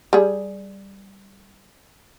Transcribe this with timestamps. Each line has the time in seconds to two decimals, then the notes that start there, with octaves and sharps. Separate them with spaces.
0.13 G3 G#4